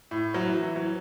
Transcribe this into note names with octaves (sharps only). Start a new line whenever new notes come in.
A2
F#3
E3
E3
F#3